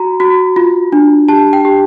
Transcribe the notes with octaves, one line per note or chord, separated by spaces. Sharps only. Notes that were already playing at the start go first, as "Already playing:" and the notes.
Already playing: F#4 A#5
F#4
F4
D4
G4 A5
G5
G4